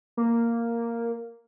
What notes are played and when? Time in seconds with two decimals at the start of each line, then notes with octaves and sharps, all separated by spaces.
0.17 A#3